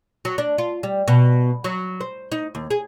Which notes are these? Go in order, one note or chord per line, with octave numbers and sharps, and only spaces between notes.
F#3
D4
F4
G3
B2
F#3
C5
D#4
D#2
G#4